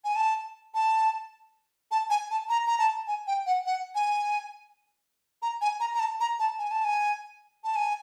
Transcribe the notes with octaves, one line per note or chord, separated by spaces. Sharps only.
G#5
A5
A5
A5
G#5
A5
A#5
A#5
A5
G#5
G5
F#5
F#5
G#5
A#5
G#5
A#5
A#5
A5
A#5
A5
G#5
A5
G#5
A5
G#5